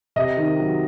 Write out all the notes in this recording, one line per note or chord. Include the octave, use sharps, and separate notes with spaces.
C3 D#5
D#3
F#3